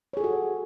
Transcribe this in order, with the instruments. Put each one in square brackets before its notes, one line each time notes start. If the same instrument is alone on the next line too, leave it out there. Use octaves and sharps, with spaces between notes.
[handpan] C#5
G#4
A4
F#4